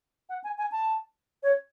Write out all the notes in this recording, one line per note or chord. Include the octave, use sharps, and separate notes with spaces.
F#5
G#5
G#5
A5
C#5